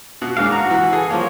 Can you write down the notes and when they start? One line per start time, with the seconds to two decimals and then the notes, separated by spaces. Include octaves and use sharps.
0.22 B2
0.37 G#2 A#3 D4 F5
0.52 F#4 A#5
0.70 E3
0.93 G#4 A4
1.10 F3 A#3 C#5